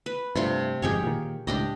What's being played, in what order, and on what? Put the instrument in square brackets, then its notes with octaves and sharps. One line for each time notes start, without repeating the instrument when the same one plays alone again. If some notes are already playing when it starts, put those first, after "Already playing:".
[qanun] B4
[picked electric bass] G2 [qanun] C3 A3 F4
[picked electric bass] G1 F2 G#2 [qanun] G4 G#4 C#5
[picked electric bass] A#2 D#3
[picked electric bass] C#2 A2 [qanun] D4 G4 D#5